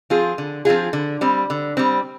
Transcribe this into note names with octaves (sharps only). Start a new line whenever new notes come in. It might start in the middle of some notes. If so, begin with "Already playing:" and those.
F3 C4 F4 G#4
D3
F3 C4 F4 G#4
D3
G3 C4
D3
G3 C4